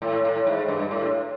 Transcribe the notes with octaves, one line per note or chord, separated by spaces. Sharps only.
A2
A2
G#2
G2
A2